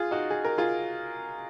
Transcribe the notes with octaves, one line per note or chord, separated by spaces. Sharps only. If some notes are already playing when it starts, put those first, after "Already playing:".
Already playing: F4 G#4
D#4 F#4
G#4
A#4
F4 G#4